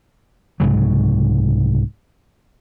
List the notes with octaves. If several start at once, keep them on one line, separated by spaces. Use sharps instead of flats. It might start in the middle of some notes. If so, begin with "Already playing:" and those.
C2 G#2 C#3 F#3